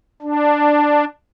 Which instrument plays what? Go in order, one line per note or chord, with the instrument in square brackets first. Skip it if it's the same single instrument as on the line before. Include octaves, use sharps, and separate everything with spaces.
[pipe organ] D4